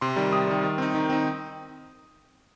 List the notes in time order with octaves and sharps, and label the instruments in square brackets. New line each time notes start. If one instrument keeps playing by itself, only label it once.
[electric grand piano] C3 C6
D#3 G3
C3 D#6
D#3 G3
D#3 D#6
C4 D#4
D#3
C4 D#4